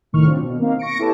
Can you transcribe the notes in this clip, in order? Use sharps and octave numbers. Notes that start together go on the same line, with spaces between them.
C2 A2 D#3 C#6 F6
F#3 C4 D4 F4
B2
A#3 C4 D#4 F5
C#6 A#6 C#7 D7
E4 G4 A4 B4 C#5 A5